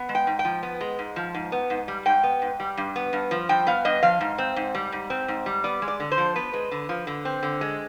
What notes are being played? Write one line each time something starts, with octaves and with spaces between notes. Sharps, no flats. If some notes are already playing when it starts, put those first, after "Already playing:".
Already playing: B3
G#3
G5
G#2
G5
F3
B3
G#3
G#2
F3
G#2
B3
G#2
G3
G#2 G5
B3
G#2
G3
G2
B3
G2
F3
G2 G5
B3 F5
G2 D#5
F3 F5
G#2
C4
G#2
G3
G#2
C4
G#2
G3
B3 D5
G#3
D5
D3
C5
F3
B3 B4
G#3
D3
F3
D3
C4
D3
G#3